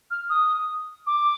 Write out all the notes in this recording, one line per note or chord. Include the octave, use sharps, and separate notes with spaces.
F6
D#6
D6